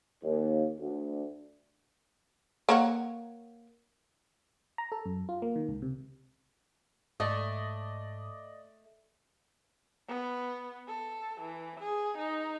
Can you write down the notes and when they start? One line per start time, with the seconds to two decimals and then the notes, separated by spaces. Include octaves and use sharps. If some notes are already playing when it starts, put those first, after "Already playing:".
0.23 D#2
0.79 D2
2.69 A#3 C#5 F#5
4.78 A#5
4.92 A4
5.05 F#2
5.29 F4
5.42 A#3
5.56 D#3
5.69 C#2
5.82 C3
7.20 G#2 A3 D5 D#5 D#6
10.08 B3
10.88 A4
11.41 E3
11.80 G#4
12.18 D#4